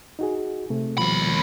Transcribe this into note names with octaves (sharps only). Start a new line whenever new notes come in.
D#4 F#4 G#4
C3 A3
D#2 B2 F3 G3 B5